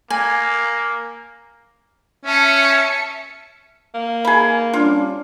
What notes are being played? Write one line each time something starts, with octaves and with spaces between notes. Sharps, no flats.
A#3 G#5
C#4 E5 A5 C#7
A#3
G#4 B5
G3 C#4 D4 F4